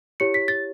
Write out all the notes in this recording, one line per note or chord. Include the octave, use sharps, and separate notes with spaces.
E4 G4 C#5 C#7
B6
A6